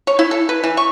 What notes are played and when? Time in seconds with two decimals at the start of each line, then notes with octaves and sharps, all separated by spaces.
0.07 C#5
0.19 E4
0.31 A4
0.49 B4
0.64 E3
0.77 C#6